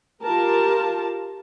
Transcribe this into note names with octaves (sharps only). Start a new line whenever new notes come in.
F4 G4 A#4 A5